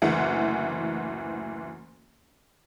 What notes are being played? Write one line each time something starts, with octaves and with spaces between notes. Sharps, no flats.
F#1 D2 E3 F#5